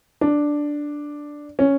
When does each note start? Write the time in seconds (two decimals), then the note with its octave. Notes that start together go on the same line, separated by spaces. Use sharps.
0.21 D4
1.59 C#4